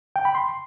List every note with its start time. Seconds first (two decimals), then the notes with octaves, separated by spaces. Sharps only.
0.16 G5
0.25 B5
0.35 C6